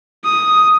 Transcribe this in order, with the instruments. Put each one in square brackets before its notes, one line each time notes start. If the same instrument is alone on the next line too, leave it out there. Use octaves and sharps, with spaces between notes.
[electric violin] D#6